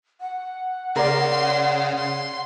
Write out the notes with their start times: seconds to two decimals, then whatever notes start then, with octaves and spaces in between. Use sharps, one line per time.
0.21 F#5
0.96 C#3 A#4 D5 C6
1.98 C6